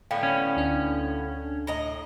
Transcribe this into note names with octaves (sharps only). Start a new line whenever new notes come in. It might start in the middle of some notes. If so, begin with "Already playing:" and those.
A2 D3 B3 F5 G5
C#4
D2 D4
A2 D#5 A#5